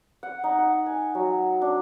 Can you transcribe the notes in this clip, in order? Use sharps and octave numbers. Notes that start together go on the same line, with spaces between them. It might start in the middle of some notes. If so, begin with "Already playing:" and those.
F#5
D#4
F#5
G#5
F#3
D4